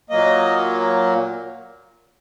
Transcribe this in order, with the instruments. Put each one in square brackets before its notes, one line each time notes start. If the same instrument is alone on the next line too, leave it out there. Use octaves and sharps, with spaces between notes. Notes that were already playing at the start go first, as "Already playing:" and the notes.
[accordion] A#2 F#3 A#3 D#5